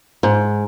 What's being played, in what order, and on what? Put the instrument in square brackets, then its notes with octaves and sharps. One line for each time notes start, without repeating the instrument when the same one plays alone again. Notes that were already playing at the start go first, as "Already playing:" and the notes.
[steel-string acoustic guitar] G#2